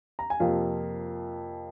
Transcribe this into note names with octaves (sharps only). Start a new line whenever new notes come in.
A#5
G#5
F2 C3 F3 A#3 F4 F5